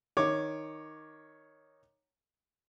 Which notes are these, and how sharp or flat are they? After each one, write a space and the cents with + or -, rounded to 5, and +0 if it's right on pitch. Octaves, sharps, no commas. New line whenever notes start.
D#3 +0 C#5 +0 D6 +10